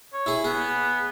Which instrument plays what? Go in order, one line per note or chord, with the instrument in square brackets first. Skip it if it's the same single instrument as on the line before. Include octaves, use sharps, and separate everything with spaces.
[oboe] C#5
[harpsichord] E4 G#4
[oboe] B3 [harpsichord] G#4